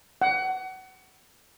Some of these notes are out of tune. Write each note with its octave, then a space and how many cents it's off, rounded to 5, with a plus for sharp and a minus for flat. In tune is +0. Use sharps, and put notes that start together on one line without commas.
F#5 +25